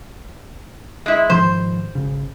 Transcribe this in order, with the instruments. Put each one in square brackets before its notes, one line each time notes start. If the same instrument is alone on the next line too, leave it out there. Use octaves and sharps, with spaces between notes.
[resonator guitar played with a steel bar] G#3 E4
[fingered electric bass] G#2 D#3 F3 [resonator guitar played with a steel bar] C5
[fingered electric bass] G#1 C#3